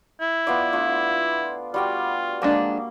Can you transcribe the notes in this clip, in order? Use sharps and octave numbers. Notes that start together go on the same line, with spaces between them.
E4
B3 F4 D5
A3 D4 F4
G3 F4 F#4 G5
F3 G#3 A#3 D4